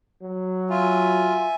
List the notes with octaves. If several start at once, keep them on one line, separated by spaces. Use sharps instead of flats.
F#3
F4 E5 G#5